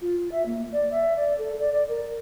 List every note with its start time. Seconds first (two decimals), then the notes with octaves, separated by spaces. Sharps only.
0.01 F4
0.31 E5
0.46 A#3
0.72 D5
0.91 E5
1.16 D5
1.38 A4
1.60 D5
1.72 D5
1.88 A#4